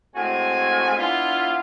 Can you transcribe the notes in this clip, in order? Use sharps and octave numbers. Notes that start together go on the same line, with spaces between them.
A2 G#3 C4 F#4 G#5
B3 D4 E4 F4